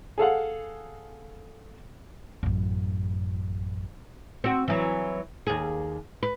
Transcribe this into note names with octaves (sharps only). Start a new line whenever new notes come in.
G#4 A4 F5 F#5
A1 F#2
C4 F#4
E3 F#3
D#2 G#4
B4